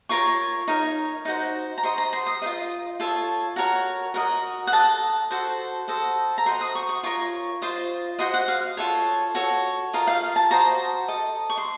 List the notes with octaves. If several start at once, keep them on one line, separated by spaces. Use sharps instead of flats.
F4 A#4 C#5 C#6
D#4 A#4 C#5
D#4 F#4 C5
A#5
F#4 C5 D#5 C6
A#5
C6
D#6
F4 C5 D#5
F4 A4 C#5
F#4 A#4 C#5
F#4 A#4 D#5
F#5
A4 D#5 A5
F#4 A4 C5
F#4 A4 C5 D#5
A#5
F#4 C5 D#5 C6
D#6
C#6
C#6
F4 A#4 C#5 C#6
F4 C5 D#5
F#4 C5 D#5 C6
F#5
F5
F4 A4 C#5
F#4 A4 C#5
F4 A#4 D#5
F5
A5
F#4 C5 D#5 A#5
A4 D#5
C#6
C6